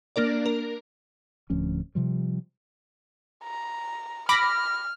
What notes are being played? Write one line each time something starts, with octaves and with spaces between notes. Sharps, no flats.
A#3 D4 A#4 D5
A#4
D1 D2 F3 C#4
C3 F3 G3
A#5
B5 D6 F6 A#6